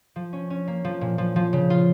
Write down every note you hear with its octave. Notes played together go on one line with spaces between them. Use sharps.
F3
C#4
C#4
A#3
F3
A#2
F3
F3
C#3
F4